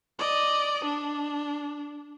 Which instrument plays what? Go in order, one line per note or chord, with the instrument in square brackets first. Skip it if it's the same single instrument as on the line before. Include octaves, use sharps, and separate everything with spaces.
[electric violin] D5 D#5
D4